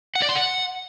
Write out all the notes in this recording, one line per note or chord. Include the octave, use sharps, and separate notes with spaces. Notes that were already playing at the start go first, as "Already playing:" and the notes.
F#5
D5
C6
F#5